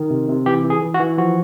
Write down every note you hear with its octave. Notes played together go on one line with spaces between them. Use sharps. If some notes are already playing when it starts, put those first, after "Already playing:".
Already playing: D#3
C3
C3
E3 G4
E3
G#4
E3
F#4
E3
F3 F#4